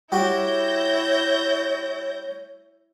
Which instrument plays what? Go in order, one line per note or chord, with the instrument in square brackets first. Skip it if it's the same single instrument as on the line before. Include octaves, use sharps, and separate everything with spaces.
[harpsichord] G3 F#4 [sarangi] E4 [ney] C#5 [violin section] G6 A#6